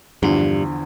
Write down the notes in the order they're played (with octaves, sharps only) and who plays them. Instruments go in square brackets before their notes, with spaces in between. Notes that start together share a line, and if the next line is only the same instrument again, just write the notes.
[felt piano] E2 D3 F3 [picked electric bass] G2